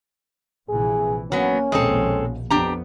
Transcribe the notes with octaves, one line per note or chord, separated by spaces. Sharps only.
A#1 C3 E3 G#4
F#3 A#3 B3 C#4
A#1 D#2 B2 G#3 C4 A4
F2 B3 D4 G4 A#5